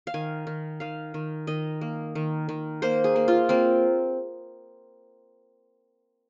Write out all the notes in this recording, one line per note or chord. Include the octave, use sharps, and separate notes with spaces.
F5
D#3 G#5
D#3
D#3 F5
D#3
D#3 D#5
A#3
D#3
D#3
A#3 C5
G#4
A#3
F4
A#3 C4